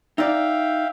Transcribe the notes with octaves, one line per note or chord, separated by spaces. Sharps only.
D#4 D5 E5 F5 G5